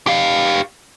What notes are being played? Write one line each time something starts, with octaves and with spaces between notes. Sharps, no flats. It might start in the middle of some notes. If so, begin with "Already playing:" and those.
G4 F5